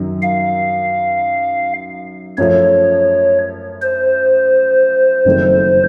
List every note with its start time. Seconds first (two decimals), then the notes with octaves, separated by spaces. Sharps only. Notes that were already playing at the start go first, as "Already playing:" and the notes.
Already playing: F#2 D#3 F#3
0.22 F5
2.38 F#2 F3 A3 C#5
3.82 C5
5.25 F#1 F2 D#3 F#3 A3